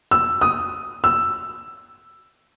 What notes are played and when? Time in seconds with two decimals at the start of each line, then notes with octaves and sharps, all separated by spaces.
0.11 E6
0.41 D#6
1.04 E6